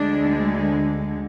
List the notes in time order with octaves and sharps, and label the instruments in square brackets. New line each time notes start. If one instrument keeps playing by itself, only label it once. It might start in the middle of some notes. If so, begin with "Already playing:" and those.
Already playing: [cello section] D2 D3 G#3 D4